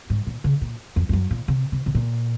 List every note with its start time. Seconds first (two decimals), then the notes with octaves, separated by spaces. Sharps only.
0.10 G#2
0.27 A#2
0.44 C#3
0.61 A#2
0.96 F2
1.09 F2
1.13 F#2
1.31 A#2
1.48 C3
1.72 C3
1.86 C3
1.95 A#2